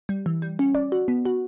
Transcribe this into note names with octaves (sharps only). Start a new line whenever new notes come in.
G3
E3
G3
C#4
D5
F#4
B3
F#4